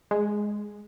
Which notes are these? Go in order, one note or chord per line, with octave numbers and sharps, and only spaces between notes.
G#3